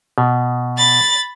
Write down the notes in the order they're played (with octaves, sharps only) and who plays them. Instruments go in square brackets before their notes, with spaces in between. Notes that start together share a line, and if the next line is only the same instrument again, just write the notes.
[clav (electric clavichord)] B2
[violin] B5 A6